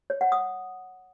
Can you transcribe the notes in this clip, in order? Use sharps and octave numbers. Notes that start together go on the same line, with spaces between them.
C#5
F#5
D#6